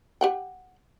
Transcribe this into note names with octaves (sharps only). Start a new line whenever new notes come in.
G4 F#5 G5